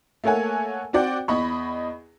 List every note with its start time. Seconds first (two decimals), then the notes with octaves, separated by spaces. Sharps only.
0.24 A3 A#3 A4 C#5 F#5 G#5
0.93 C4 F#4 D5 F#5 G5
1.28 E2 D#5 B5 C#6